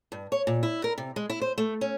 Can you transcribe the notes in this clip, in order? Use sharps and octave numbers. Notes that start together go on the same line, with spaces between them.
G2
C#5
A#2
E4
A#4
C3
G#3
E4
C5
A3
C#4